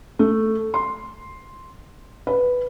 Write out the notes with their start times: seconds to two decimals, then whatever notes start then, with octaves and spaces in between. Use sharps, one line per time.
0.19 A3
0.74 C6
2.27 B4